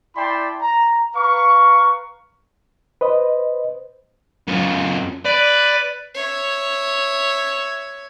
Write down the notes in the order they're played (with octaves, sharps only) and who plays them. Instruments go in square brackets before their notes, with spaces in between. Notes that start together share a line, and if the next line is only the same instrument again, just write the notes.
[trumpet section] E4 D5 G5 A5 B5 C6
A#5
B4 F5 A#5 C#6
[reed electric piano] B4 C5 D#5
[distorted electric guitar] F#2 F4
[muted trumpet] B4 [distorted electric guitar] D5
[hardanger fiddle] C#5 E5